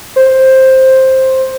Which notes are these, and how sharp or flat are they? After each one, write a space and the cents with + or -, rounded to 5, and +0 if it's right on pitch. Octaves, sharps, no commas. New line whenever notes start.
C5 +10